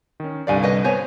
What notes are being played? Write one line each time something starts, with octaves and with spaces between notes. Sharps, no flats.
D#3 C#4
C2 G2 D3 D5 F5 G#5
B3 B4 D#5
B3 C5 C#5 G#5